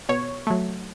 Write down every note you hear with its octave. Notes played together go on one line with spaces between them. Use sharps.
B2 C#5
F#3 A3